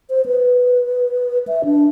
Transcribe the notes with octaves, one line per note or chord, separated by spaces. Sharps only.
C5
B4
E5
D4